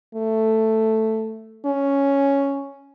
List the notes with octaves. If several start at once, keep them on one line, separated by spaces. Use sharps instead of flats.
A3
C#4